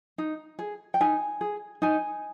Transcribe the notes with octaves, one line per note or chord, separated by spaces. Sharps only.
D#4
G#4
G5
D#4 G#5
G#4
D#4 G#5